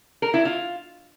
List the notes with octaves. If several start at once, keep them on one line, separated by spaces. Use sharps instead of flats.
A#4
E4
F4